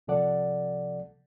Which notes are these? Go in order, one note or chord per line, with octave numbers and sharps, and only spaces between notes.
C2 C3 F3 A4 D5 F#5